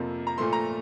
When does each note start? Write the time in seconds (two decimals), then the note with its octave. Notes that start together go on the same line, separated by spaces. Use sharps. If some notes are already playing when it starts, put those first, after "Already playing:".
Already playing: F2 C3 F3 A#3
0.27 A#5
0.38 A#2 F3 A3 C6
0.53 A#5